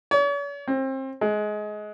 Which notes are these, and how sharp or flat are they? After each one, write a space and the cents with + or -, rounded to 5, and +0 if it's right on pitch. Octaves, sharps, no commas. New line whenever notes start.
C#5 +45
C4 +30
G#3 +20